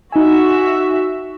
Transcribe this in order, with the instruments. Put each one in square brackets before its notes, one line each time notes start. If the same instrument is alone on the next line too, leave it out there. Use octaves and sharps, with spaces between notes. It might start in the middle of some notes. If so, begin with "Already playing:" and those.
[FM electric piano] D#4 G#5 [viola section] F#4 E5